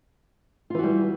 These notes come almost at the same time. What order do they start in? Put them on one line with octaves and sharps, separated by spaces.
F4 E3 F#4 G3